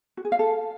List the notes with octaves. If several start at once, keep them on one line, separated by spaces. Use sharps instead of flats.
F#4
G#4
F5
A4